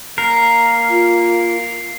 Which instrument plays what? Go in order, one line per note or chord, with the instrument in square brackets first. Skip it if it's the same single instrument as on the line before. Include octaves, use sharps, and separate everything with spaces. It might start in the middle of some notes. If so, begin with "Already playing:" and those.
[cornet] A#3 [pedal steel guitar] A#4 [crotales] C7
[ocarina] F4